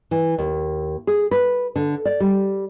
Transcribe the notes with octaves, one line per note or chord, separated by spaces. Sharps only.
E3
D#2
G#4
B4
D3
D5
G3